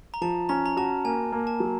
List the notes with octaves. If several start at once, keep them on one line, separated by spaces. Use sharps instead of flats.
A#5
F3 A5
C#4 A#5
A#5
F#4 A5
A#3 G#5
A#3
A5
F#3